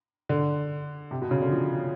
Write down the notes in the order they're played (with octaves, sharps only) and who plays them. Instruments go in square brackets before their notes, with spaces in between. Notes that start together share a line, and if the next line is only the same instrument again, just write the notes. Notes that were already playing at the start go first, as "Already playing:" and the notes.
[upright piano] D3
C3
B2
C#3
D3
F3